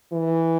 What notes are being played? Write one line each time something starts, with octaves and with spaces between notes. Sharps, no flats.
E3